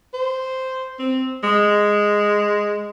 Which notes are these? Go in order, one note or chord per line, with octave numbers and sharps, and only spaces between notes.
C5
C4
G#3